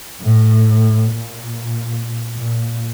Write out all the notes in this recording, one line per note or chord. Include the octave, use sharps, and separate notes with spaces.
A2
A#2
A#2